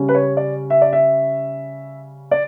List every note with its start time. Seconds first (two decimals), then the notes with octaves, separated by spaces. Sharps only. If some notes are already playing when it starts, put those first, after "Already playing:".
Already playing: C#3 G3 C#4
0.09 B4
0.15 C#5
0.37 D5
0.70 E5
0.81 D5
0.93 E5
2.31 D5